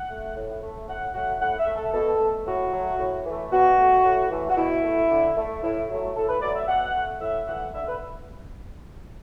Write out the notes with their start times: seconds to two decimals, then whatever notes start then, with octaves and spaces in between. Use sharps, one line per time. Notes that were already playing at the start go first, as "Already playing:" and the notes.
Already playing: F#5
0.09 A3
0.36 A2
0.62 A3
0.88 A2 F#5
1.14 F#3 A3 F#5
1.41 A2 F#5
1.58 E5
1.67 A3
1.76 A4
1.94 B2 A4
2.20 A3
2.46 A2 F#4
2.73 F#3 A3
2.99 A2
3.25 E3 A3
3.52 B2 F#4
3.78 A3
4.05 A2
4.31 E3 A3
4.49 F#4
4.57 B2 E4
4.84 A3
5.10 D3
5.37 A3
5.63 A2 E4
5.89 F#3 A3
6.15 A2 A4
6.28 B4
6.41 F#3 A3 D5
6.55 E5
6.68 B2 F#5
6.94 A3
7.20 A2 E5
7.47 E3 A3 F#5
7.74 D3 E5
7.87 B4